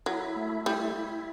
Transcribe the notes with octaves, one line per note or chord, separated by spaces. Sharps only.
F#3 E4
A3
G3 E4
E4